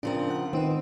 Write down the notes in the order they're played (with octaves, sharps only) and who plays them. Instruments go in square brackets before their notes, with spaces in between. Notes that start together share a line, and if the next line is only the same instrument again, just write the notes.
[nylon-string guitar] C#3 F3 C4 [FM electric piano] D4 A#4
[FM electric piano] F#5
[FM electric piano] D#3 D#4 B4 [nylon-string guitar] C4